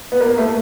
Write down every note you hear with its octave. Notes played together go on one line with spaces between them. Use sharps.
B3
A#3
A3